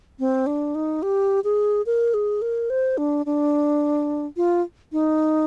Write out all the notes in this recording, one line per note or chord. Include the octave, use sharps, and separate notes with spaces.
C4
D4
D#4
G4
G#4
A#4
G#4
A#4
C5
D4
D4
F4
D#4